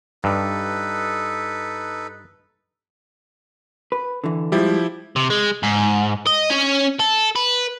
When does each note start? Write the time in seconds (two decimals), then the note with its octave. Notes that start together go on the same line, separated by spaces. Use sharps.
0.24 G2 D#4 A4 B4
3.92 B4
4.24 D3 E3
4.52 F3 G3 G#3 E4 G4
5.16 C3
5.30 G#3
5.63 G#2
6.27 D#5
6.50 C#4
7.00 A4
7.36 B4